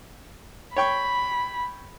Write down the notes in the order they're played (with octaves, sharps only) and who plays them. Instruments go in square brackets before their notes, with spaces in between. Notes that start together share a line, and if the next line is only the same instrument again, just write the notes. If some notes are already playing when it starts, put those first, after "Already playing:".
[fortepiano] C#5 G5 C#6 [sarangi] B5